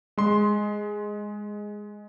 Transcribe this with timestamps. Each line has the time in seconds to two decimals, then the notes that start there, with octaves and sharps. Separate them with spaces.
0.18 G#3 C6